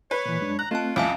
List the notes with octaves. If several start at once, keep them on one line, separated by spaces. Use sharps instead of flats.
B4 C#5
A#2 E3
F#2 G#3 D4
A#5 F#6
A3 C4 F4 D#5 A5
C2 F2 C#4 F5 G#5 D6